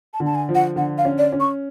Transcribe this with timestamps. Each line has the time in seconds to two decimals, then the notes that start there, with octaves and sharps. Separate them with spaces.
0.14 A5
0.20 D3
0.26 A5
0.35 G#5
0.49 F3
0.55 F#5
0.76 D3 F#5
0.98 F5
1.05 C#4
1.18 D5
1.32 C#4
1.40 C#6